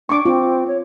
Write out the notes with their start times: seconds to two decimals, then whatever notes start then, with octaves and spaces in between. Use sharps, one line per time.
0.09 D4 C#6 D6
0.25 C4 F4
0.68 C#5